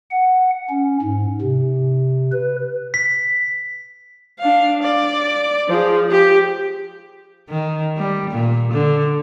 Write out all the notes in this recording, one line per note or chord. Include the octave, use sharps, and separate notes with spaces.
F#5
C#4
G#2
C3
B4
B6
D4 F5
D5
F3 G#4
G4
D#3
G3
A#2
D3